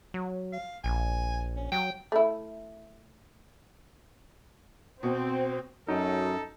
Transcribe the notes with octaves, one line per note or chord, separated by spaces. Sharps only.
F#3
F5
A#1 G#5
C#4
F#3 G5
A3 E4
B2 C4
F#2 F#3 D#4 A4